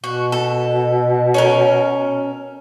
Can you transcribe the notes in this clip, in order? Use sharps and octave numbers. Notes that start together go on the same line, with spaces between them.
B2 F#4
A4
C#4 A4 A#4